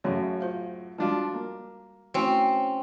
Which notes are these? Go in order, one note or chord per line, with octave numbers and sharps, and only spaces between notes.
F#2 A2 C#3 F#4 C#5
F4 C5 F5
F3 G3 G#3 D4 F4 F#4
A#3
A3 C4 C#4 E4 F#4